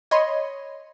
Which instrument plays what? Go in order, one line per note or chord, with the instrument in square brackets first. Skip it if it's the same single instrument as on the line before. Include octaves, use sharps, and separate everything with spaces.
[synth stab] C#5 D#5 B5 C6